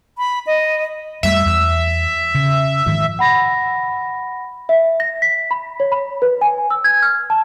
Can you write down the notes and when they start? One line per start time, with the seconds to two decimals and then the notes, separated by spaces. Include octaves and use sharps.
0.18 B5
0.47 D#5
1.23 F2 G3 A3 E5
1.46 E2
2.35 C#3
2.86 G#2 D#3 F3
3.19 F#5 B5 A#6
4.69 E5
5.00 A#6
5.22 B6
5.51 B5
5.80 C#5
5.92 B5
6.22 B4
6.41 G#5
6.70 E6
6.84 G#6
7.02 F6
7.30 A5